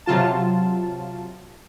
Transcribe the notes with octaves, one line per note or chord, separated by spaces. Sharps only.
C3 F#3 F4 A5